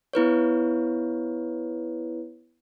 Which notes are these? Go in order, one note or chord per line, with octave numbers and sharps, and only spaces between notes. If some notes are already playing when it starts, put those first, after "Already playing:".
B3 E4 B4 C#5